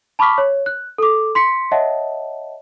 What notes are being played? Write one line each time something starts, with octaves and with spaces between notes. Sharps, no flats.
A5 B5 C#6 D6 F6 B6
C#5
F#6
A4 D6
C6 B6 C#7
C#5 D#5 E5 F#5 A5